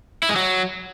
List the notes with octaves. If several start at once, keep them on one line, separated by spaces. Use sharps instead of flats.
E4
G#3
F#3